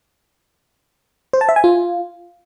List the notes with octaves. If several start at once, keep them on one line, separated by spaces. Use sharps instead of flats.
C5
A5
E5
G#5
F4